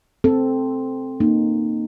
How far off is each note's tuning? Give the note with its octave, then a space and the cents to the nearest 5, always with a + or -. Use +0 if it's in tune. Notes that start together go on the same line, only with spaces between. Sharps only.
C4 +0 A4 +0
A#3 +0 D#4 -20